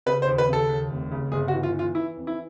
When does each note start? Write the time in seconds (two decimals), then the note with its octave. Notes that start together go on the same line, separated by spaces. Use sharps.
0.06 C#3 B4
0.22 C5
0.27 D#2
0.38 B4
0.48 C#3 A4
0.69 D#2
0.91 F1
1.11 C#3
1.32 G1 G#4
1.48 F#4
1.54 E3
1.63 F4
1.74 E3 F4
1.95 E3 E4
2.17 F2
2.27 E4